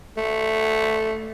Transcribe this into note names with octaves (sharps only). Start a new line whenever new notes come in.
A3